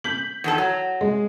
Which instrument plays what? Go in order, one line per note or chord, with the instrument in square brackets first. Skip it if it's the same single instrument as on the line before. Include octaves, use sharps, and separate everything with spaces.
[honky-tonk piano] G6 B6 F#7
[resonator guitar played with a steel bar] E2 D#3 A4
F#3
[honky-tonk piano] G#3